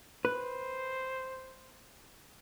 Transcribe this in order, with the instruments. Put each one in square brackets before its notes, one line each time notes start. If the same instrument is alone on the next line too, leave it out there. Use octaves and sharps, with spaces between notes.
[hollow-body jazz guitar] B4 [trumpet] C5